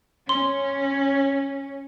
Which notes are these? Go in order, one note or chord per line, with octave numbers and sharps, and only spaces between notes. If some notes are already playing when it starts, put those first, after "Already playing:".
C#4 C6